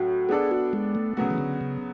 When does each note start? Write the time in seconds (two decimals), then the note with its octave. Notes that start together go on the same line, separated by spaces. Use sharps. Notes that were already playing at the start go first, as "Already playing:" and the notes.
Already playing: A2 F#3 C#4 F#4
0.29 B3 D4 G#4 A4 D5
0.51 F#4
0.73 G#3
0.95 A3
1.17 C#3 F#3 A3 B3 F#4
1.31 E3
1.38 D3
1.61 C#3